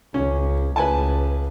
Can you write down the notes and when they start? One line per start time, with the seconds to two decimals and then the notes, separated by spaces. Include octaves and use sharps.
0.14 C#2 C#4
0.76 C#2 B4 G#5 A5